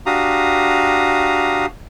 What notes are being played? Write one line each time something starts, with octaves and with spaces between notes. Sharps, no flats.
D4 F#4 G4 F5 A#5 D#6